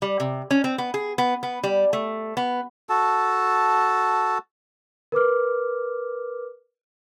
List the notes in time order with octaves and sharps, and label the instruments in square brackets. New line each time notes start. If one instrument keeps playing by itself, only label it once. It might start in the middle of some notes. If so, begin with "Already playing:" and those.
[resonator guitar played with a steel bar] G3
C3
C#4
C4
B3
G#4
B3
B3
G3
A3
B3
[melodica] F#4 A4 A5
[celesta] A#4 B4 D6 F6